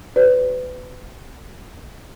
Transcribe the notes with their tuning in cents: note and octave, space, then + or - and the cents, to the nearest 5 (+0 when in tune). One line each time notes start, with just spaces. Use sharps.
F#4 +45 B4 +30 D5 -45